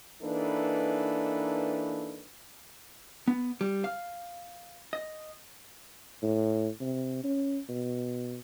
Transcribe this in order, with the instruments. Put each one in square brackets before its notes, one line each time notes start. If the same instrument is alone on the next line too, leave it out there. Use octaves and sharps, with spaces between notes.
[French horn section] E3 A#3 D4 D#4 A4 B4
[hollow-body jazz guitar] B3
G3
F5
D#5
[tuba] A2
C3
C#4
B2